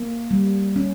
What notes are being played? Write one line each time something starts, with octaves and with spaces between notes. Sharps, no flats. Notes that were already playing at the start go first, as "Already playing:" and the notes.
Already playing: A#3
G3
C#4